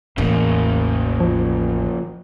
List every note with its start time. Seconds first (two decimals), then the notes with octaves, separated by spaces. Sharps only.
0.18 A1 E2 C#3 A#3
1.20 F3